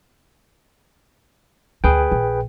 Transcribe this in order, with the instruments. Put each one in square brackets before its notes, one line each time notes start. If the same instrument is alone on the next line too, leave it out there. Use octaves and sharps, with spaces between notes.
[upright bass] D2 [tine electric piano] G#4 B4 G5
[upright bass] A#1